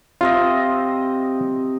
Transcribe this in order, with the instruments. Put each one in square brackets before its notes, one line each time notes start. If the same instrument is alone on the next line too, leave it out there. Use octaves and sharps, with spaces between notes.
[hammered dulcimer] C3 C4 D#5 [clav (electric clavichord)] F4